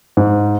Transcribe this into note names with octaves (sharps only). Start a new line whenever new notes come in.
G#2